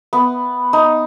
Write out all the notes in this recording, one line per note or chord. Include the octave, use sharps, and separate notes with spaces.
B3
D#4